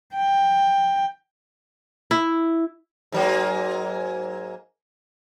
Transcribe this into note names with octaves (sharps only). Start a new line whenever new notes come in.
G5
E4
G#2 F#3 A#3